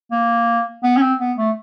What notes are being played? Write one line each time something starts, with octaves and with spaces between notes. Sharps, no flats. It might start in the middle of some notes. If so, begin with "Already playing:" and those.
A#3
B3
C#4
C4
B3
A3